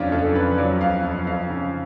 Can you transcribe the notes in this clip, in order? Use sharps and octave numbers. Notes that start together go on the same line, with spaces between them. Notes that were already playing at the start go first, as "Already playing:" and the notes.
Already playing: F2 C#3 F#3 C#4 D4 F4
F2 A4
C#3 B4
F#3 D5
F2 F5
F2
F2 F5
C#3